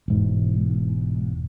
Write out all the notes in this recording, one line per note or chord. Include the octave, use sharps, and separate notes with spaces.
E1 G#2